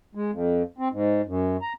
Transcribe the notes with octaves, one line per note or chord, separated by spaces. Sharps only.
G#3
F2
C4
G#2
F#2
A#5